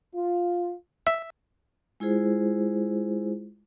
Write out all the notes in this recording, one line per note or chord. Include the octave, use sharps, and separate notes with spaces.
F4
E5
G#3 E4 F4 G#4 C5